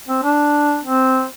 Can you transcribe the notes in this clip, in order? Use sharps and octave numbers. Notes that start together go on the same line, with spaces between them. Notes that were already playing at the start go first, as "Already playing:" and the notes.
C4
D4
C4